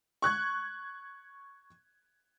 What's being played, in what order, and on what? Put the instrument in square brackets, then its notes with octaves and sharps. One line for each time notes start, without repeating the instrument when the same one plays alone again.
[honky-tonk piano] C#6 F#6 G#6